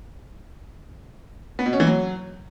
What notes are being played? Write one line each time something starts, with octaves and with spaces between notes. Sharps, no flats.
B3
B2
C#4
E3
F#3